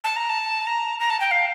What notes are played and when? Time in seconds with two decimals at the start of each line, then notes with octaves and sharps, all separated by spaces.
0.04 A5
0.16 A#5
0.29 A5
0.67 A#5
1.00 A#5
1.10 A5
1.20 G5
1.31 F5